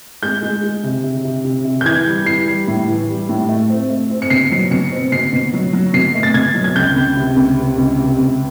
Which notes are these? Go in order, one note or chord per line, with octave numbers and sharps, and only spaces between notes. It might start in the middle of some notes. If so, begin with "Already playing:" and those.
G#3 G6
G#3
G#3
C3
C3
C3
C3
C3
G6
E3 G#6
G3
E3 C7
G3
A2
E3
G3
A2
A3
C4
A3
C4
C#7
B2 C7
F#3
B2 C#7
C4
B2 C7
B2
F#3
F#3
B2 C7
A3
A6
B2 G#6
F#3
G#6
C#2 G6
C#2
C3
C#2
C3
C#2
C3
C#2